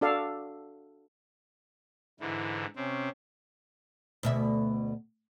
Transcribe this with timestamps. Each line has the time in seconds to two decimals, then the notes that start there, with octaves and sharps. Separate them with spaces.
0.01 D4 F#4 A4 D5 F5
2.20 G#2 D3 E3 E4
2.76 C3 C4 C#4
4.23 D2 B2 E5